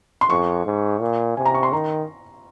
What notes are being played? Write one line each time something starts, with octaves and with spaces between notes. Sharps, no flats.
C6
F2 C#6
G#2
A#2
C3 G#5
A#5
C#6
C6
D#3 A#5